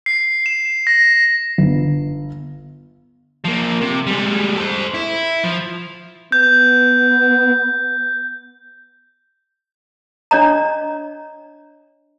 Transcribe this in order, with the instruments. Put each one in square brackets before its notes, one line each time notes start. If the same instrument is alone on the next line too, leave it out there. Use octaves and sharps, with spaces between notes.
[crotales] C7
E7
A#6
[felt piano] G1
[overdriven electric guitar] F3 A#3
C3
G3 G#3
A4 C5
E4
F3
[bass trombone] B3 [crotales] G6
[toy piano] D4 C#5 D#5 A#5